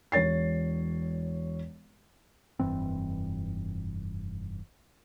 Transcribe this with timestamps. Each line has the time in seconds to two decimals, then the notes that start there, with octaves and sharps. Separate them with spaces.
0.12 E1 C#5 A6 C7
2.59 F1 G2 E3 C4